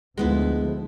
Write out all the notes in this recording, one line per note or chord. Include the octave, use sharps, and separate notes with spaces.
D2 F3 G#3 B3 E4